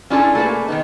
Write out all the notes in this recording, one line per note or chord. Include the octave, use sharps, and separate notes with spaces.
C#4 D4 E4 F4 G#4 A4
A3 A#3 G#4 B4
D#3 B3 D#4